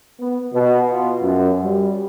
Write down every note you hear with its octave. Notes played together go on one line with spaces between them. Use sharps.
B3
B2
F4
F#2
G3